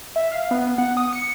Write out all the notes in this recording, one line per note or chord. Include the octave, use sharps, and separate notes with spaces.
E5
F5
B3
F#5
D#6
C#7